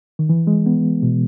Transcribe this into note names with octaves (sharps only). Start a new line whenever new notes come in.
D#3
E3
G#3
B3
B2